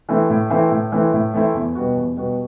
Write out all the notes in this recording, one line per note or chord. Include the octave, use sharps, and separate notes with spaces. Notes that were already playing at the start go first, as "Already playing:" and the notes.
E3 A3 C4 E4
A2
E3 A3 C4 E4
A2
E3 A3 C4 E4
A2
E3 A3 C4 E4
E2
B2 G3 B3 F#4
E2
B2 G3 B3 F#4